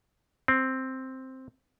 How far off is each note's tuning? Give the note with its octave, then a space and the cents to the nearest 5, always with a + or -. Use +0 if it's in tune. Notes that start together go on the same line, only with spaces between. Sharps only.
C4 +0